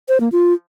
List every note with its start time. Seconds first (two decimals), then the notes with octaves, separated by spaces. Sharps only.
0.09 C5
0.20 A#3
0.32 F4